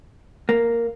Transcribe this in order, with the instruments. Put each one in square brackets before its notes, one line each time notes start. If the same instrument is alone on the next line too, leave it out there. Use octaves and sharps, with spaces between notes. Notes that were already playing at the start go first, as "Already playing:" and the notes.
[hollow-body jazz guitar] A#3